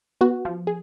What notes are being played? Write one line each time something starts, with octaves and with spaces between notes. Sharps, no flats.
B3 F#4
F3
G#4